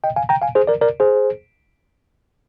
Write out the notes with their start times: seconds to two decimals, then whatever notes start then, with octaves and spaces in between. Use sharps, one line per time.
0.04 D#5 G5
0.16 F5 G#5
0.29 G5 A#5
0.42 F5 G#5
0.55 G#4 C5
0.67 A#4 D5
0.81 A#4 D5
1.00 G#4 C5